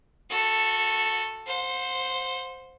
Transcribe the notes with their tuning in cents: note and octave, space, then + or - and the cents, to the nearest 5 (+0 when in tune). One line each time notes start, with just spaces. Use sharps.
F#4 -20 A4 +5
C5 +0 F#5 -40